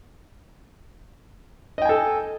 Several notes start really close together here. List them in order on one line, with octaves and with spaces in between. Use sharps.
D#5 G5 G#5 A4